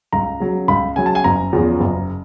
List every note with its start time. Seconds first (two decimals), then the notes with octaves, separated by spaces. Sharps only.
0.12 C#2 A#5
0.40 C#3 F#3
0.68 C#2 B5
0.96 C#3 F#3 G#5
1.06 A5
1.15 G#5
1.24 F#1 A#5
1.53 E2 C#3 F3
1.80 F#1